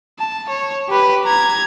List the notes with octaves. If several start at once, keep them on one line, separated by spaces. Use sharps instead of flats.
A5
C#5
G4 B4
A#5 G#6